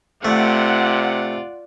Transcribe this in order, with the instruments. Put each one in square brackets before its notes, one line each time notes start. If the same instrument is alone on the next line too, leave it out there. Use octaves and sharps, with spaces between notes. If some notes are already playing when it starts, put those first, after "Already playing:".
[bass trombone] C3 [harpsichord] A3 [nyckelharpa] F4 D5 [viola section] F#5